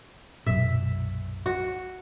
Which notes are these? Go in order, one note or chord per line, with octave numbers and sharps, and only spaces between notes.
B1 F#2 A#2 E5
F#4